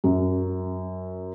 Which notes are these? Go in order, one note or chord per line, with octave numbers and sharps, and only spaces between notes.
F#2